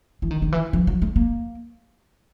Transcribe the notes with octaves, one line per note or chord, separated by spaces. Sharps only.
E3
D#3
D#3
E3
F3
F#3
A3
A#3